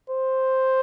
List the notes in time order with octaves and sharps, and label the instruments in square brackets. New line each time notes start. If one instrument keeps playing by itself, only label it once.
[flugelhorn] C5